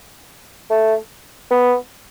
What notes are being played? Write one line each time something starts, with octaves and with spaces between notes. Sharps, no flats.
A3
B3